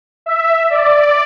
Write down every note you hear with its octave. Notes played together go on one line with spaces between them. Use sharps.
E5
D5